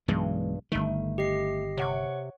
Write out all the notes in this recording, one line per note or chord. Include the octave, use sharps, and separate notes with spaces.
B1 G2 E3 G#3
G1 D#3 A3
G4 D#5 C7
C3 C#5 F#5 C#6